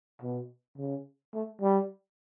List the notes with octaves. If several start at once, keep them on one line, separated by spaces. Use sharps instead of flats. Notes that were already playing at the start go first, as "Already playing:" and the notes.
B2
C#3
A3
G3